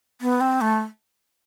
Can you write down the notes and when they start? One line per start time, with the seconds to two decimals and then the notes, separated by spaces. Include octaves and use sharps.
0.21 B3
0.41 C4
0.61 A3